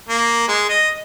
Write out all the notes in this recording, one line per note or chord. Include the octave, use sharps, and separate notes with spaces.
A#3
G#3
D#5